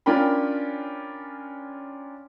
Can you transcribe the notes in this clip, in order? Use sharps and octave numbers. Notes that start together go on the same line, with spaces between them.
C#4 D4 F4 A#4 G5 B5